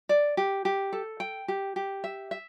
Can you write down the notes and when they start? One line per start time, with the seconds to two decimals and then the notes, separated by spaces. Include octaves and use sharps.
0.09 D5
0.37 G4
0.65 G4
0.93 A4
1.20 G5
1.48 G4
1.76 G4
2.04 E5
2.31 E5